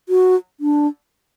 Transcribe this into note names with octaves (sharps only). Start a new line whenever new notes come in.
F#4
D4